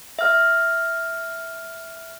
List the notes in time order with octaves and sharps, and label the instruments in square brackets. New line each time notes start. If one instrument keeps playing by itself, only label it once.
[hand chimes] E5 F6